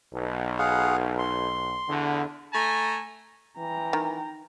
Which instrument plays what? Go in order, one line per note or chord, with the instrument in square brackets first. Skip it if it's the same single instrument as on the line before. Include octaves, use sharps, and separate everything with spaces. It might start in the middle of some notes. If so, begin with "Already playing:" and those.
[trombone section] B1
[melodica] G#4 F5 F#5
C6
[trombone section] E2 D3
[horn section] A3 G#5 A#5
[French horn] E3 [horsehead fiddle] G5 A#5
[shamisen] D#3